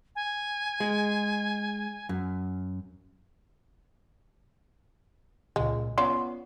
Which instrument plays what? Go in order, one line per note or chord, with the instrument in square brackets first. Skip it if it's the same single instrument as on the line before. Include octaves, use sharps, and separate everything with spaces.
[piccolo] G#5
[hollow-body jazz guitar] G#3
F#2
[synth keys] C#2 A#2 C#3 [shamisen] G#3
[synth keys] B3 [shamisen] C#4 F4 D5 [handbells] C6